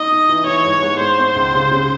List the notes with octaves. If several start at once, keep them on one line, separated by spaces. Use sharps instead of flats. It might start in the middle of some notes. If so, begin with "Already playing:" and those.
Already playing: D#4 D#5
D#4
E3
E3 C#5
G#2
G#2
G#3 C5
C4
C#2
C#3
C#3